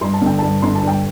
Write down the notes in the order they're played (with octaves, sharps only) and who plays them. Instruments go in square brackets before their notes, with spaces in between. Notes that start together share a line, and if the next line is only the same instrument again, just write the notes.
[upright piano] G2 C6
A5
D3 G5
G2 A5
D3 C6
A5
G2 G5